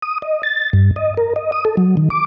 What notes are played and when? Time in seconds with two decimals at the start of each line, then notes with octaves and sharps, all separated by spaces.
0.02 D#6
0.22 D#5
0.43 A6
0.73 G2
0.96 D#5
1.17 A#4
1.36 D#5
1.52 D#6
1.65 A4
1.77 F#3
1.97 D#3
2.10 D6